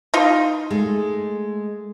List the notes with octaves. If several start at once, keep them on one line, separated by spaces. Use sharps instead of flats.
D#4 F4
G#3 A3